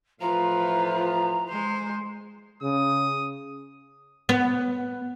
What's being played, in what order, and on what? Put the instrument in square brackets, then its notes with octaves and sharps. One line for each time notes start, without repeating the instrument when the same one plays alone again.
[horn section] A2 E3 F3 [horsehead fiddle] F4 B4 [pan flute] A#5
[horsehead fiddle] G#3 C5
[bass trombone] C#3 [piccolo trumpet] D#6
[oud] B3